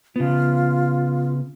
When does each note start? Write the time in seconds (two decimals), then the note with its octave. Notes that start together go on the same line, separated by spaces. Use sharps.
0.16 C#3 B3 F4